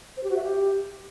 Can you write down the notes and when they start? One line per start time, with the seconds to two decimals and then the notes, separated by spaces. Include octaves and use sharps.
0.17 C5
0.23 G4
0.30 F#4
0.36 E5
0.43 G4